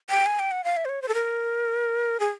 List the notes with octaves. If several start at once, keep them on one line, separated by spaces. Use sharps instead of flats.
G5
G#5
G5
F#5
F5
E5
C5
C#5
C5
A4
A#4
G#4